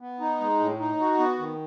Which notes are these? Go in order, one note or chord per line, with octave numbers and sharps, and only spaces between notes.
B3
D#4
G#3
A2
D#4
F#4
B3
D#3